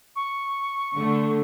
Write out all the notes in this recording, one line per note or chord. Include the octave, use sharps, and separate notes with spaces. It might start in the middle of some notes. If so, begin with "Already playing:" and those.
C#6
D3 A3